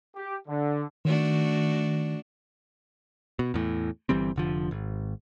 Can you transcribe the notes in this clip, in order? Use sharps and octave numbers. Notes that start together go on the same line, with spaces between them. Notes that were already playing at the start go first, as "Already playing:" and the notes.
G4
D3
D#3 A3 D4 F#4
B2
E2 A2
G1 E3 G3 C4
F1 D3 F3
G#1